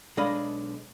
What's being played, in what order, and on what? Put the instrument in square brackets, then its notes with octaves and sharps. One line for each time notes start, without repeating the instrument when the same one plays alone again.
[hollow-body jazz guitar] B1 G#3 D4 D#5 F5 B5